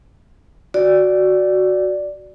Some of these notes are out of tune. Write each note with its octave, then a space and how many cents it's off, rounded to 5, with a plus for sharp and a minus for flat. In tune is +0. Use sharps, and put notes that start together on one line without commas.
F#4 +0 D5 +0